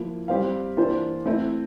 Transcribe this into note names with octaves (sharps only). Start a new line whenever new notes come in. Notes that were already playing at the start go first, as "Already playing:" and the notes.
Already playing: F3 A#3 E4
G3 C4 G4 C5 F5
E3 A#3 D4 F4 C5
A3 C4 E4